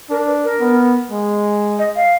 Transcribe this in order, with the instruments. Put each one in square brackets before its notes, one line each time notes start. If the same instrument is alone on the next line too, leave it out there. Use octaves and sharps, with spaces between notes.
[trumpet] D4 [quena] A#4
[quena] B4
A#4
[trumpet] B3
G#3
[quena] D#5
F5